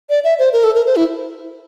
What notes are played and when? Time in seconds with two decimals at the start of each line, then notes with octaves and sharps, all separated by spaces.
0.10 D5
0.24 E5
0.39 C5
0.53 A#4
0.64 A4
0.75 A#4
0.86 C5
0.96 E4